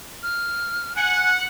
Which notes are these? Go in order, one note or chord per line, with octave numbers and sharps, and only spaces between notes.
F6
F#5 G#5